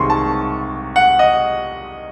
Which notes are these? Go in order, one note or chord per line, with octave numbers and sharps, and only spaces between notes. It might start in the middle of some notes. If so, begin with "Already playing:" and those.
Already playing: C2 C3 D#3 G#3 C6 C#6
A5
F#5
D#5